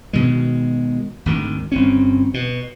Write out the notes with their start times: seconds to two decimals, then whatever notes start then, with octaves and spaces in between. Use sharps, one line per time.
0.13 B2 D#3 G#3
1.26 G#1 D2 D#3
1.72 G1 C4 C#4
2.34 B2